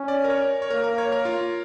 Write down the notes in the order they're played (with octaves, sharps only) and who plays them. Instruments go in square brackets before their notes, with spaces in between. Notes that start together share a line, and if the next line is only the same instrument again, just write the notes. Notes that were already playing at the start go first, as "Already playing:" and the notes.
Already playing: [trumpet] C#4
[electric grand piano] D5
A#4
C#5
C#5
[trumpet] A#3 [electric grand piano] A#4
[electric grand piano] A#4
C#5
A#4
F4